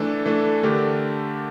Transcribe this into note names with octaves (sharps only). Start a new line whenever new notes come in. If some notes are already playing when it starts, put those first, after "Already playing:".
Already playing: E3 A3 D4 A4
E3 A3 D4 A4
D3 A3 D4 G4 A#4